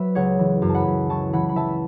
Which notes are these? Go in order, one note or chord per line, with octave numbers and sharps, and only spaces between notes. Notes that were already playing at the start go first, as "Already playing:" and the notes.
Already playing: F#3 B4 E5
C#2 C#5 F#5
E3
F#2
A5
F#5 B5
F#2
E3 A5 C#6
E3 F#5 B5
B5
E3 E5 A5